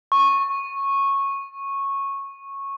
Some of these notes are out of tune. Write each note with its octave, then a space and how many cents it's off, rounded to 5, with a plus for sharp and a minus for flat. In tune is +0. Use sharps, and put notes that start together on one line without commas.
C#6 -10